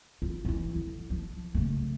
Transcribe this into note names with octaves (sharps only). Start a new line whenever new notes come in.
F4
E3 E4
D3
F3
C#3 A3